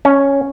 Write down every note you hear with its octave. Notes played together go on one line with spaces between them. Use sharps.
C#4